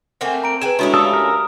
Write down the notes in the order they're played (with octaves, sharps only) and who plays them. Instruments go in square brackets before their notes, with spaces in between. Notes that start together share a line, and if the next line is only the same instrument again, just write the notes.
[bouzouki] A3 A#3 C4 [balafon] F#5 G#5
[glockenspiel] A#5 D7
[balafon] G#4 B4 [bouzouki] G5 G#5 [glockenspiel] E7
[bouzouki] A2 C#4 E4 [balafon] G#3 D4 F#4
[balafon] G4 D5 F5 [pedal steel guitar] A4 [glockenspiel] D#6
[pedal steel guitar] A#4